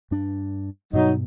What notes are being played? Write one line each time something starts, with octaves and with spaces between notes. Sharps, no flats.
G2 D4
G2 B2 F#3 D#4